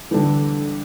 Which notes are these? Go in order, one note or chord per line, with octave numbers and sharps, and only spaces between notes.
D3 E3 G3 B3 D4